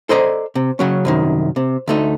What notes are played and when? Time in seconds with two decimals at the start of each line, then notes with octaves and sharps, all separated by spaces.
0.09 A4 C5 D5 D#5 A#5
0.55 C3
0.79 C#3 F#3 C#4
1.05 C2 F#2 D#3
1.56 C3
1.87 D2 A3 D#4